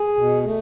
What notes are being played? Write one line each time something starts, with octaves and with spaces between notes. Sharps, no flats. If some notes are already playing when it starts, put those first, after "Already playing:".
Already playing: G#4
B2
A3